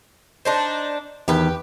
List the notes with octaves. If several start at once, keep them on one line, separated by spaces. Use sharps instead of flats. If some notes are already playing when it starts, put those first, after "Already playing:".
D4 D#4 C5
E2 D#3 G4 B4